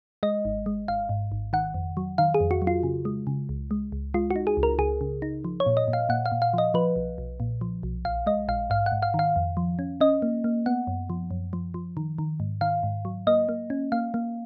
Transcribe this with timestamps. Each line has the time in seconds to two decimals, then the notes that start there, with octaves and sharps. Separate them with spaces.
0.23 G#3 D#5
0.45 G#1
0.66 G#3
0.88 G#1 F5
1.09 G#2
1.32 G#1
1.53 D#3 F#5
1.74 F2
1.97 F#3
2.18 D#3 F5
2.34 G#4
2.40 F2
2.51 F#4
2.62 F#3
2.67 F4
2.83 C#3
3.05 G#3
3.27 C#3
3.49 C#2
3.71 G#3
3.92 C#2
4.14 G#3 F4
4.31 F#4
4.36 D#4
4.47 G#4
4.57 C#2
4.63 A#4
4.79 C#2 G#4
5.01 C#3
5.22 D#4
5.45 F3
5.60 C#5
5.66 A#2
5.77 D#5
5.88 A#2
5.93 F5
6.09 A#2 F#5
6.26 F5
6.32 A#2
6.42 F5
6.54 F3 D#5
6.74 F3 B4
6.96 B1
7.18 B1
7.40 A#2
7.61 F3
7.83 B1
8.05 A#1 F5
8.26 G#3 D#5
8.48 A#1 F5
8.70 G#2 F5
8.86 F#5
8.92 G#2
9.02 F5
9.14 D#3
9.19 F5
9.36 F2
9.57 F3
9.79 C#4
10.01 C#4 D#5
10.22 A#3
10.44 A#3
10.66 B3 F#5
10.87 F#2
11.10 F3
11.31 F#2
11.53 F3
11.74 F3
11.97 D#3
12.18 D#3
12.40 G#2
12.61 D#3 F5
12.83 G#2
13.05 F#3
13.27 A#3 D#5
13.49 A#3
13.70 C#4
13.92 A#3 F5
14.14 A#3